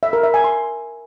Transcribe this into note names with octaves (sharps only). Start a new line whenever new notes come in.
E5
A#4
E5
G#5
C6